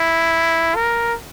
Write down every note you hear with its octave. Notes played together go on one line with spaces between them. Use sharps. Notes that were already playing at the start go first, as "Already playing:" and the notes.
Already playing: E4
A#4